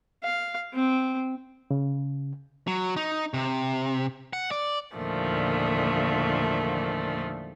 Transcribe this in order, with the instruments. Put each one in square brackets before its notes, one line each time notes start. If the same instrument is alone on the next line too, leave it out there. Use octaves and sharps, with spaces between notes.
[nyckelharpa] F5
C4
[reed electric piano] C#3
[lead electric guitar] F#3
D#4
C3
F#5
D5
[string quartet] E2 A#2 D3 D#3 F3 A3